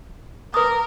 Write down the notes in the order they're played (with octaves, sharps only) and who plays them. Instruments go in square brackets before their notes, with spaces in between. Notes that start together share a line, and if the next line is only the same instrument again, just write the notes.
[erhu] A#4 [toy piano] B4 D6 D#6